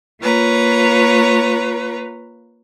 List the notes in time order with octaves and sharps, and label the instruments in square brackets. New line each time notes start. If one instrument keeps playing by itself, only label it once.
[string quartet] A#3 F4 B4 C#5 A#5